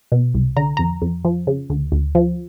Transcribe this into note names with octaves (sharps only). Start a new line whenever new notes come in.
B2
C2
D3 A#5
F2 A#5
F2
F3
C#3
D2
D2
F3